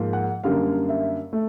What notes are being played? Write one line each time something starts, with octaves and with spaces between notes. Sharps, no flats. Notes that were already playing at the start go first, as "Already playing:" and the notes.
Already playing: G#2 F3 A#3
F#5
F#2 D3 G3 A#3 F5
E5
A3